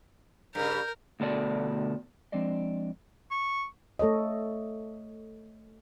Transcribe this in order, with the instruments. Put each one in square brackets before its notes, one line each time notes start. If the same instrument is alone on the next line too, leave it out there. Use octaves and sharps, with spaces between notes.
[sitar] G2 C#3 [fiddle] A#4 [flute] G6
[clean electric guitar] D2 B2 A4 D5
F3 G#3 C4 D4 D5 D#5
[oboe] C#6
[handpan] A3 A4 C#5 D#5